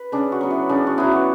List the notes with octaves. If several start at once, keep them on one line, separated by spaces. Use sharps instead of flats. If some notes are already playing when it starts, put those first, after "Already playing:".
Already playing: B4
C#3 D4
F#4
F#3 B3
E4
C#3 D4
F#4
F#3 B3 E4
F#4